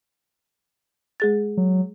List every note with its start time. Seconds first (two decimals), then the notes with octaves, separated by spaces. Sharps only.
1.20 G#3 G#4 A6
1.57 F#3